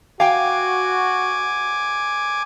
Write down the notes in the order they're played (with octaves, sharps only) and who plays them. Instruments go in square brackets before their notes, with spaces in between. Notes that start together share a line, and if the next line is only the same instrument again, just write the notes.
[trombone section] F#4 [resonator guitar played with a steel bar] F5 G5 [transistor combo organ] G#5 D6